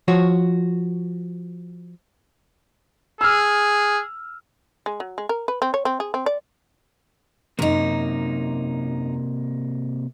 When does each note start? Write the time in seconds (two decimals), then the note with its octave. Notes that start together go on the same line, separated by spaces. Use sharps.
0.08 F3 F#4 C#5
3.21 G#4 E6 F6
4.86 G#3
5.00 F#3
5.18 G#3
5.29 A#4
5.48 B4
5.62 C4
5.74 C#5
5.85 C4
6.00 G#4
6.14 C4
6.26 D5
7.59 F#2 C3 A#3 D#4